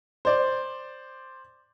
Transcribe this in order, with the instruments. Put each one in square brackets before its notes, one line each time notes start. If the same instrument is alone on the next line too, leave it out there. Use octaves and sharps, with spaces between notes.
[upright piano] C5 D5